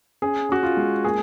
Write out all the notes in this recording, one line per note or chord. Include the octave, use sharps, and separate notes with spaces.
C#4 G#4
C#4 F#4
F4
G#3
A#3 G#4